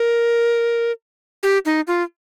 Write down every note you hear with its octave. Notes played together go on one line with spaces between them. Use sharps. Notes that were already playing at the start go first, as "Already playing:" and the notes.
Already playing: A#4
G4
D#4
F4